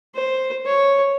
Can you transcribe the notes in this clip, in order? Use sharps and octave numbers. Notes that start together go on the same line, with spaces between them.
C5
C#5